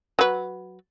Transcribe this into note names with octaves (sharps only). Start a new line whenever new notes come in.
F#3 B4